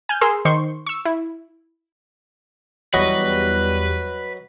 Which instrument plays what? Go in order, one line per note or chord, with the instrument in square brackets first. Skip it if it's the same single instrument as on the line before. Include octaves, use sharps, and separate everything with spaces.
[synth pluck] G#5 F6 G6
G#4 A#4 C6 E6
D#3 C5 C6 C#6
C#6 E6
E4
[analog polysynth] E2 G3 [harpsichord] F#3 D#5 C#6 [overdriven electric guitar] B4